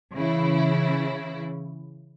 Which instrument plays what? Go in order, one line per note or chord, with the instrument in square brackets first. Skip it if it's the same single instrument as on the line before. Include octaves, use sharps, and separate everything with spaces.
[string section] C#3 E3 E4